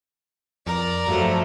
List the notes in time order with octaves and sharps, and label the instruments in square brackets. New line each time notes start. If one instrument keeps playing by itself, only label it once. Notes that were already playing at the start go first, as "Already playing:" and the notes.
[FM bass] F2 [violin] A#4 D5
[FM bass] G2 [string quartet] F3 F#3 A3